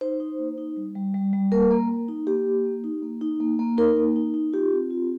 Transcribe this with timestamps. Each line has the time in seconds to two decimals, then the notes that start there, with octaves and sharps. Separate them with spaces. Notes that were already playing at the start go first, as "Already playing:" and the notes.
0.01 D#4 C5
0.20 D#4
0.39 A#3
0.58 D#4
0.76 G3
0.95 G3
1.14 G3
1.33 G3
1.52 A#3 A#4
1.71 A#3
1.90 A#3
2.08 D#4
2.27 A#3 G4
2.46 A#3
2.65 A#3
2.84 D#4
3.03 A#3
3.21 D#4
3.40 A#3
3.59 A#3
3.78 D#4 A#4
3.96 A#3
4.16 D#4
4.34 D#4
4.53 F4 G4
4.72 C4
4.91 F4